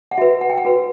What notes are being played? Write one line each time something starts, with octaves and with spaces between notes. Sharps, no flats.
F#5
F#4 B4 E5
F#5
G5
F#5
F#4 B4